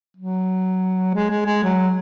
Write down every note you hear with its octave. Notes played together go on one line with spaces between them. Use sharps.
F#3
G#3
G#3
G#3
F#3